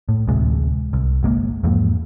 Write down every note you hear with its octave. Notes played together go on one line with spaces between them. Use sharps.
A2
A1 D2 C3 G#3
C2
G1 G#3 A#3
E2 G#2 F3 A#3